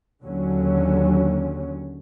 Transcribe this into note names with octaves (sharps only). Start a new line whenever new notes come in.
D#2 D3 F#3 C#4